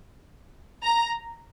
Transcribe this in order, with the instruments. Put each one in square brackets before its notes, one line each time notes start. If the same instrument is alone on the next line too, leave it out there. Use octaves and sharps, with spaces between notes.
[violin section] A#5